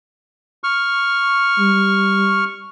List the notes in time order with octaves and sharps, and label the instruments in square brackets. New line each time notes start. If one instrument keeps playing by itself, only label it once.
[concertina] C#6 F6
[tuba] G3